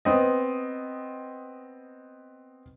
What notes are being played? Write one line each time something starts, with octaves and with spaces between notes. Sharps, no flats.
B3 C4 D#5